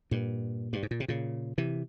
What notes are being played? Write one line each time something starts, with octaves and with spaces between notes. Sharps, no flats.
G2 A#2
G2
G#2
A#2
C3
A#2 C#3
C3 E3